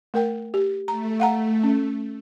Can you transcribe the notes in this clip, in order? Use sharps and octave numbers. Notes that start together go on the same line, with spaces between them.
A3 A#4 G5
G4
A3 A#5
F5 F#5 A#5
C#4